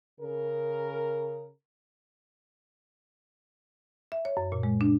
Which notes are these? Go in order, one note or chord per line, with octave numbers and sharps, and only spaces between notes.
C#3 A#4
E5
C#5
F#2
A#2
G#3
D4